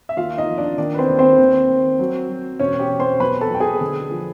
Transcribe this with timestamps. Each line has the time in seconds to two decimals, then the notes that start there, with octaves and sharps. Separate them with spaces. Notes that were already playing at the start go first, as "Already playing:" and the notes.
0.09 E5
0.17 D#2 F4 F5
0.37 D#4 D#5
0.47 F3
0.58 D4 D5
0.78 D#3 D4 D5
0.94 B4
0.98 C4 C5
1.09 D#2
1.19 C4 C5
1.38 D#2
1.69 D#2
1.99 F#3
2.29 F#3
2.59 E1 C#4 C#5
2.80 G4 G5
2.91 E1
3.00 C5 C6
3.20 B1 B4 B5
3.41 A4 A5
3.50 B1 G5
3.60 G#4 G#5
3.81 D3
4.11 F3